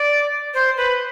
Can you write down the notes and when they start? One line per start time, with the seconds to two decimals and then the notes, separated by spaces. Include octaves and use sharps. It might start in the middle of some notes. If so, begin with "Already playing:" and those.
Already playing: D5
0.54 C5
0.77 B4